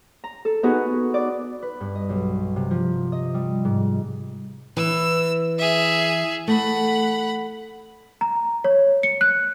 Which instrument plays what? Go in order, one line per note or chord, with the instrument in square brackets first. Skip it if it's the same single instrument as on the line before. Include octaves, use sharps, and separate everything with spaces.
[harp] A#5
A4
B3 D#4 F#4 G#4 B4
D5
B4
G2
D#5
B1
C3
F3
D#5
G3
G#2
[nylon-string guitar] E3 [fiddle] E6
[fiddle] G#4 E5
[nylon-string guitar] A3 [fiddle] F#5 B5
[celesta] A#5
C#5
C#7
F#6